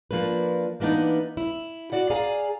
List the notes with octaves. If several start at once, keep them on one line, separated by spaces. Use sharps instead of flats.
F3 A#3 D4 B4
E3 A#3 B3 D4 D#4
E4
F#4 D5 F#5
G#4 D5 F5 G#5 A#5